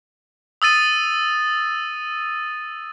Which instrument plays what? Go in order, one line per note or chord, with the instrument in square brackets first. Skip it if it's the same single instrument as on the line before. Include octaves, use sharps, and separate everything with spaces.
[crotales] D#6 E6 A6 D#7